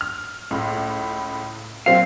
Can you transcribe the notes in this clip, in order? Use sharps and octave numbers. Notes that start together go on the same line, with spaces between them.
F6
C#2 A2
A#2 F#3 C4 F5